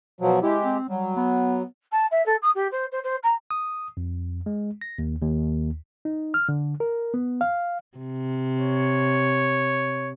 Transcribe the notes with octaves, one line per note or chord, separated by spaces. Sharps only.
B2 F3 F#3
G#3 E4 G4
C4
F#3 G3
B3
A5
E5
A4
D#6
G4
C5
C5
C5
A#5
D#6
F2
G#3
A#6
D#2
D#2
D#4
F6
D3
A#4
B3
F5
C3
C#5